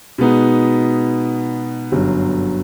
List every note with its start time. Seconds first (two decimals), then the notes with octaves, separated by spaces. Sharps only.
0.18 B2 G#3 B3 D#4
1.92 G1 F#2 D3 F#3